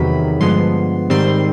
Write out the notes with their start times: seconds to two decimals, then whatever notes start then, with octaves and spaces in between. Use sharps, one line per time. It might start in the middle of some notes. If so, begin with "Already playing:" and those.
Already playing: E2 C3 D#3 F#3 B5
0.40 G2 D3 F3 G#3 B3 C6
1.10 G#2 D#3 G3 C4 C6